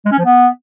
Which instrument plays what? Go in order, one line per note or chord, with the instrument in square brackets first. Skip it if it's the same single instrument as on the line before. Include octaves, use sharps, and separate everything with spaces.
[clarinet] G#3
C#4
F3
B3